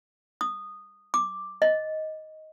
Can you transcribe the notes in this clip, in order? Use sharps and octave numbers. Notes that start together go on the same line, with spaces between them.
D#6
D6
D#5